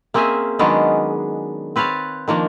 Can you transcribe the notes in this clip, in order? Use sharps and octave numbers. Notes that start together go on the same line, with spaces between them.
A#3 C4 C#4 G#4 E5 G#5
D#3 F#3 G#3 B3 C#4 D4
C4 B4 C#5 F5 A5
D#3 F3 A#3 D4